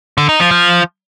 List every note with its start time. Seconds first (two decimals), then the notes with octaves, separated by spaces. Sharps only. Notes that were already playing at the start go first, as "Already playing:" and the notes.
0.18 D3
0.29 D#4
0.40 F3
0.51 F3